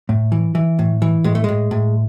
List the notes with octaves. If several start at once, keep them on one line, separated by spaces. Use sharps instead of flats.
A2
E3
E3
A2
E3
A2 G#3
A3
A2 G#3
A2